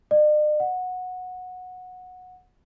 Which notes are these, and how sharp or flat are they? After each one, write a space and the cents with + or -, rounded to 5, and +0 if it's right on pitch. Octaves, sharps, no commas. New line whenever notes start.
D5 +45
F#5 -15